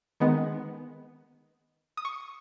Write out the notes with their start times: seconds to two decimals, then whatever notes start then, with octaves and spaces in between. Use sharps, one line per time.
0.20 D#3 G#3 B3
1.97 D#6
2.05 C#6